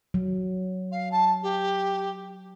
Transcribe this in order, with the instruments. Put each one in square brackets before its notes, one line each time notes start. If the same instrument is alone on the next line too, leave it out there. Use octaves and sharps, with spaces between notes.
[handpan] F#3
[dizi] F5
A5
G4